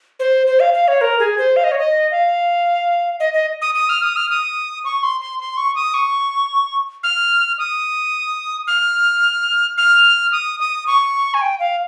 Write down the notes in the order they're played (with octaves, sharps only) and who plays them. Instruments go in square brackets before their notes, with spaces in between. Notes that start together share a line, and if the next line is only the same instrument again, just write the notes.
[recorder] C5
C5
F5
F5
C#5
A#4
G#4
C5
F5
D#5
C#5
D#5
F5
D#5
D#5
D#6
D#6
F6
D#6
F6
D#6
C#6
C6
C6
C6
C#6
D#6
C#6
F6
D#6
F6
F6
D#6
D#6
C#6
G#5
G5
F5